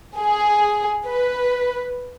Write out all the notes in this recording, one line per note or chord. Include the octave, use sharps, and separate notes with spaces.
G#4
B4